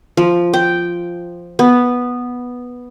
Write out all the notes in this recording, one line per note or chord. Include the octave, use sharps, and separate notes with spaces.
F3
G5
B3